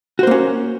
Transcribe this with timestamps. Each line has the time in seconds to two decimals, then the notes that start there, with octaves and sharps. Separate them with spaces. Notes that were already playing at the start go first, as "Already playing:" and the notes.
0.19 F#4
0.23 C5
0.27 A#3
0.31 C#4